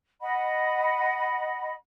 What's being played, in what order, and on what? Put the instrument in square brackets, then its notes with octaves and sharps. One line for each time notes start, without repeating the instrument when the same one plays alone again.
[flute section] D#5 F#5 B5